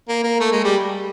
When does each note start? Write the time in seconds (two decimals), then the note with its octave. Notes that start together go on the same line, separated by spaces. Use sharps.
0.09 A#3
0.24 A#3
0.40 A3
0.52 G#3
0.64 G3